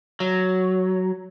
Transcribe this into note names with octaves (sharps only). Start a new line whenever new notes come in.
F#3